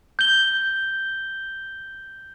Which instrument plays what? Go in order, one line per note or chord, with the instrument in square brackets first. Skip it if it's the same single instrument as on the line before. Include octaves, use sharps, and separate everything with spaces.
[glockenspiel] G6 G7